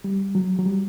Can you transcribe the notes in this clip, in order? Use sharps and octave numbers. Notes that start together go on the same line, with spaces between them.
G3
F#3
F#3
G3